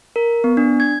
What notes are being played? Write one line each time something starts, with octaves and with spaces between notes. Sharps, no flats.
A#4
B3
D4
G#6